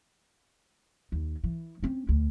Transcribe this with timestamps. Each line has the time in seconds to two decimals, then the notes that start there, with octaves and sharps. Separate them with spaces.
1.12 D#2
1.44 E3
1.83 C4 C#4
2.09 D2